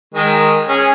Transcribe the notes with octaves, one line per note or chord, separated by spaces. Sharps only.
D#3 G#3
C#4 G#4